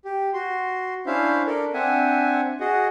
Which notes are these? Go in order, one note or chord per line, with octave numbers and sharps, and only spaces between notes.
G4
F#4 C6
C#4 D4 E4 C5 E5 F5
D4 A4 A#4 D5
C4 D4 E5 F#5 G#5
F#4 G#4 D#5 F#5